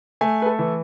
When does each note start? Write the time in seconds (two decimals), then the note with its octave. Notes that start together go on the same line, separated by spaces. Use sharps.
0.21 A3 G#5
0.42 B4
0.46 A4
0.59 E3